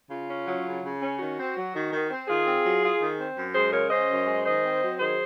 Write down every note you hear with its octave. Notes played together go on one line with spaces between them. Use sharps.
C#3 F4
C#4
F#3
C#3
C#3
C#4
D#3 F#4
C4
F#3
D#3
D#3
C4
D#3 F4 G#4
C4
F#3
F4
D#3
C4
F#2
G#3 G#4 C5
C#3 A#4 C#5
C#4 C5 D#5
F#2
G#3
D#3 C5 D#5
C4
F#3
D#3 G#4 C5